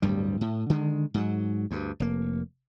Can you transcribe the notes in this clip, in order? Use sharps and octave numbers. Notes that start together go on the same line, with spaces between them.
D1 D2 G2 G3
A2
D3 D#3 G#3
G#2 F#3
D2 G2
F1 A#3